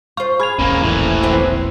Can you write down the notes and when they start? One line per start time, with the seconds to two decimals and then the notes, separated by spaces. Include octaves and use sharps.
0.17 F4 C5 C#6
0.40 G#4 B5 G#6 F7
0.59 E1 A#1 A#2 C#3 A#3
0.82 A2 E3
1.23 D3 C4 B4